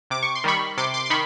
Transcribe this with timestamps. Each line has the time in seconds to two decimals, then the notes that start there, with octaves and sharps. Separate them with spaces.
0.10 C3 D6
0.23 C#6
0.35 C6
0.44 D#3 G3 B5 C#6
0.77 C3 C6 D6
0.94 C6 D6
1.06 C6
1.10 D#3 B5 C#6